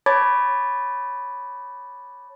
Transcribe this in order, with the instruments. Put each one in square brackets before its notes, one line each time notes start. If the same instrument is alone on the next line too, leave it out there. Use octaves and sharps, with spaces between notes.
[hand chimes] C#5 A5 B5 D6 G#6 A6